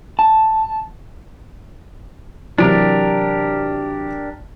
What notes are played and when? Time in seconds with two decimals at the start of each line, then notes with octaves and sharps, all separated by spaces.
0.19 A5
2.58 C3 E3 F#3 D4 G4 A#4